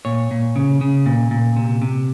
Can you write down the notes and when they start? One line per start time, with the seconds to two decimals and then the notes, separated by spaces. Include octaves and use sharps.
0.05 A#2 C#5
0.31 A#2
0.56 C#3
0.81 C#3
1.06 A#2
1.31 A#2
1.56 C3
1.82 C3